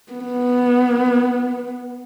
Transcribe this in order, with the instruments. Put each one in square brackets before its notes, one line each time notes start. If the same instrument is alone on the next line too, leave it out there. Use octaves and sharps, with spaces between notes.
[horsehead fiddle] B3